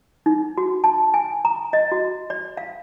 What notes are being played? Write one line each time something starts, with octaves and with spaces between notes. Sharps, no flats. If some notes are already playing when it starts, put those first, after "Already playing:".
D#4
F#4
A5
G#5
A#5
D#5
F#4
D5
F5